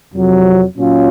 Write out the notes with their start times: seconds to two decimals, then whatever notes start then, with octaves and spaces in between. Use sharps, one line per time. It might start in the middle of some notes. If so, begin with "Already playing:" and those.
0.13 F2 C3 F#3
0.75 A#2 F#3 C#4 F4